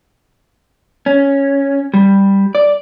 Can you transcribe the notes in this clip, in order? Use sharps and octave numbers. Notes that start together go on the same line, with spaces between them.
C#4
G3
D5